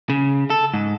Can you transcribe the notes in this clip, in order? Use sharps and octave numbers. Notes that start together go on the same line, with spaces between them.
C#3
A4
G#2